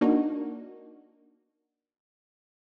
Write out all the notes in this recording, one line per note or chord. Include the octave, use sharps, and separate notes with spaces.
A#3 D4 D#4 F#4